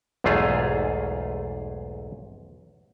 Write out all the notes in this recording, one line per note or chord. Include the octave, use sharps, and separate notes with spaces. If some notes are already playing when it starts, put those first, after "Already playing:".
B1 E2 G#2 A3 F4 G#4